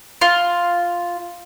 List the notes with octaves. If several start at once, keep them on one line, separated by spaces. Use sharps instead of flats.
F4